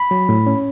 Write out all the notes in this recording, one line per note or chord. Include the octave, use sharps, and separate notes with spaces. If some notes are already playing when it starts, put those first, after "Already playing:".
Already playing: B5
F#3
A2
C#4